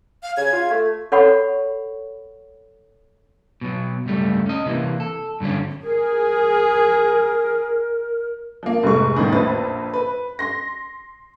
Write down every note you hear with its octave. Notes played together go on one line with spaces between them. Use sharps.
F5
C#3 G#6
F4
A3
A4 C#5 F#5 B5 C#6
B2 F#3
C#2 G2 G3 A3
C#4 D#5
C3 E3 G#3 A#3
A4
G2 D3 F#3 C#4
G#4 A#4
F3 A#3
F1 G#2 G#3 A3 C#6
A1 E2 A2 D#3
A#1 F2 B4 A6
B4
C6 A#6